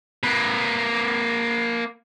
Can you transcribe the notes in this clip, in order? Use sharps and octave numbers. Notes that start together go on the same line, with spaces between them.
A#3 B4